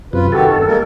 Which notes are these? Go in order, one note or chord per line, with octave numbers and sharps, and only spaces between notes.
F#2 C3 F4 B4
D#3 F#4 G4 A4
E2 G2
G#3 A#3 A#4